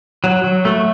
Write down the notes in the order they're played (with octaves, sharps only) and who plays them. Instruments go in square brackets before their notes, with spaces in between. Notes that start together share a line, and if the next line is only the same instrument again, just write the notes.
[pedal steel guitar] F#3
F#3
A3